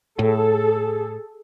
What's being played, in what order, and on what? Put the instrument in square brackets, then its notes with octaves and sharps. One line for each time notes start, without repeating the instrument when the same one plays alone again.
[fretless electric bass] A2 [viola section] G#4 A4